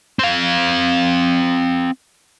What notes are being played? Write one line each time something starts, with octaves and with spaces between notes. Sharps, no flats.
C4 F5